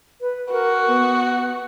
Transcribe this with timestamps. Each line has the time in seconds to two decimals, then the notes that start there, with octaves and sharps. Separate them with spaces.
0.21 B4
0.52 F#4 A#4
0.88 B3